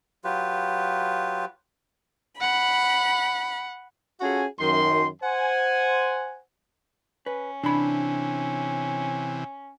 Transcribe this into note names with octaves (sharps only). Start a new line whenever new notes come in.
F#3 F4 G4 B4
F#5 B5
C#4 F4 F#4 G#4 A4 G#5
F#2 D#3 C6
C5 F#5 G#5
C#4 B4
C3 E3 D4 B5